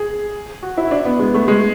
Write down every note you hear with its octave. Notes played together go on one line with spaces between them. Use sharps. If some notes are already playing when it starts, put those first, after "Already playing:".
Already playing: G#4
F#4
E4
D4
B3
G#3
A3
G#3